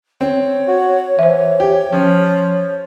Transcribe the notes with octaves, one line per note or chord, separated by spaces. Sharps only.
C4 C#5
F#4
E3 C5 E5
G4
F3 C#4